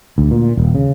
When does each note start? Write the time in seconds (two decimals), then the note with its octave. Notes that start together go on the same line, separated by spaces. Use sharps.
0.18 D2
0.31 A#2
0.57 D#1
0.75 C#3